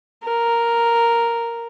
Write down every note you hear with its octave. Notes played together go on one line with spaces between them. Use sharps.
A#4